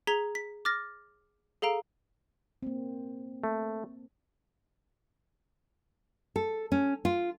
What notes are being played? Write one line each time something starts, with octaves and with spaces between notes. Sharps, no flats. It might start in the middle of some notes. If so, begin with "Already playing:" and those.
G#4 A#5 G#6 B6 F7 G7
B6
D6 F6 A6 A#6
G#4 A4 F5 A#5 D7
A#3 C4
A3
A4
C#4
F4